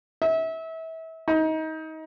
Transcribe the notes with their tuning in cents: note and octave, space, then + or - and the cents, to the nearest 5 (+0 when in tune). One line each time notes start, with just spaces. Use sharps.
E5 -30
D#4 +25